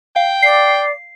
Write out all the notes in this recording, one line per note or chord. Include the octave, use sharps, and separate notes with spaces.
F5 G5
D5 C7